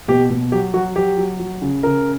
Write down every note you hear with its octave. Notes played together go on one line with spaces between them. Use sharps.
B2 G4
B2
F#3 G4
F#3 F#4
F#3 G4
F#3
F#3
C#3
C#3 A#4